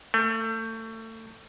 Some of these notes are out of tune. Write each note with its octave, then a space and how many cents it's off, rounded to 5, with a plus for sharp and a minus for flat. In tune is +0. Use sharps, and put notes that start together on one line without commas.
A3 +30